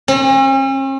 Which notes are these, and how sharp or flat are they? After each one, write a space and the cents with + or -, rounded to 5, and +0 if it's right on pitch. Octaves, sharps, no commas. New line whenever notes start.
C#4 -45